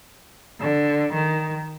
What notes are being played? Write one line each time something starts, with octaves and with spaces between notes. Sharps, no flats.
D3
D#3